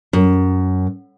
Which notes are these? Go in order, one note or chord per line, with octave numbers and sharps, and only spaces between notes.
F#2